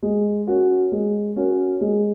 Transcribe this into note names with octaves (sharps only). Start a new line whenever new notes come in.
G#3
C#4 F#4 A#4
G#3
C#4 F#4 A#4
G#3